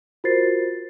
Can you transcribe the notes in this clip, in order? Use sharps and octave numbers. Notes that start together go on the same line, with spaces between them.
F4 F#4 A#4 C5 A6 C7